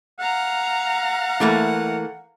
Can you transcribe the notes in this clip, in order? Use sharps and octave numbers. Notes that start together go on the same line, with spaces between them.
F5 F#5 A#5
E3 A3 A#3